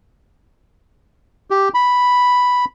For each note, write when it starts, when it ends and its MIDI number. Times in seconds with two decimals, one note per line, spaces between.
1.51 1.69 67
1.74 2.65 83